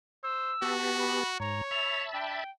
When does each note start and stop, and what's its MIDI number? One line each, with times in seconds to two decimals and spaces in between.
0.23 0.53 72
0.23 0.72 88
0.62 1.24 59
0.62 1.36 66
0.62 1.24 67
0.62 1.24 81
0.99 1.29 83
1.40 1.61 44
1.40 2.08 73
1.40 1.63 82
1.71 2.44 76
1.71 2.44 81
1.71 2.44 83
1.71 2.03 101
2.13 2.39 62
2.13 2.50 79